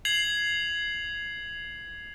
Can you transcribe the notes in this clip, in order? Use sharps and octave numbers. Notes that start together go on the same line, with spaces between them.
G#6 C7 F7 F#7